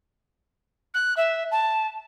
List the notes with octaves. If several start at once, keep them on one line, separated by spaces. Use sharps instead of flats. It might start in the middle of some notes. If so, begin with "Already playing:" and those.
F#6
E5
A5